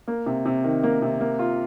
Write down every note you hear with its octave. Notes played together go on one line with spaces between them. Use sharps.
A#3
C3
C3
D#3
A#3
C3
A#3
F4